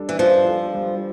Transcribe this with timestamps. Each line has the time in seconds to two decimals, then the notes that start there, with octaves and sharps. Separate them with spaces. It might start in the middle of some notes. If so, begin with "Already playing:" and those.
Already playing: G3 D4 A4
0.09 E3
0.19 F3 F4
0.46 A4
0.74 G3